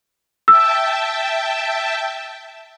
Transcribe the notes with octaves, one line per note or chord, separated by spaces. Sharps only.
E5 G5 A5 E6